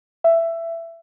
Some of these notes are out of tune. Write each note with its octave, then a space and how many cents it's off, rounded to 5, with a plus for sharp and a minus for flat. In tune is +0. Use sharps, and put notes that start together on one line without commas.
E5 +15